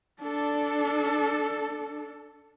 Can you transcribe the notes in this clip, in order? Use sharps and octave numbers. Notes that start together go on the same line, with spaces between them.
D4 A4